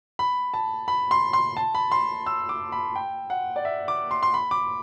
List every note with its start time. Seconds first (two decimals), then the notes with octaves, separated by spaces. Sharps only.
0.19 B5
0.54 A5
0.88 B5
1.11 C6
1.33 C6
1.57 A5
1.75 B5
1.92 C6
2.26 E6
2.49 D6
2.72 B5
2.96 G5
3.30 F#5
3.56 D5
3.65 E5
3.88 D6
4.11 C6
4.23 C6
4.34 B5
4.51 D6